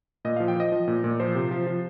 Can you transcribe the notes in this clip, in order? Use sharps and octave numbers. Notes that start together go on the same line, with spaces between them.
A#2 D#5
F3 F5
G5
F3 D#5
F3
A#2
A#2
F3 C5
C3
F3
F3